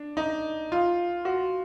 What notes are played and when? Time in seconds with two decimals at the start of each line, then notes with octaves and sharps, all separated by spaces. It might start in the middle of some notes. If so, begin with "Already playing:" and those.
Already playing: D4
0.17 D#4
0.72 F4
1.25 F#4